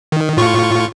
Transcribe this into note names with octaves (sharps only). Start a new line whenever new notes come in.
D#3
A2 F4 C#6